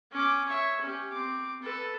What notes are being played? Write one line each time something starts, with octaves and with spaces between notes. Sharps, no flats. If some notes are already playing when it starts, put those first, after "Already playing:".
C#4 D6
C#5 E5
C#4 G4
C4 D6
A4 B4